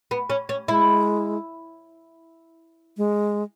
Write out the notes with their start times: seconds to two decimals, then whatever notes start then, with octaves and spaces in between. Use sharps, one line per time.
0.11 B3
0.30 C#4
0.49 C#4
0.68 G#3 E4
2.97 G#3